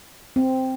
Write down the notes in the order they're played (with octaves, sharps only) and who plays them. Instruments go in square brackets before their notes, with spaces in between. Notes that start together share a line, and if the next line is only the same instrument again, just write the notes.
[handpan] C4